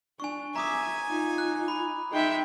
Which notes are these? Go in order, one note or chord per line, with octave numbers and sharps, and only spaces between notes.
D4 G#5 C#6
E5 G#5 A#5 D6 D#6
D#4 F4
F#6
B5
G#3 D#4 E5 G5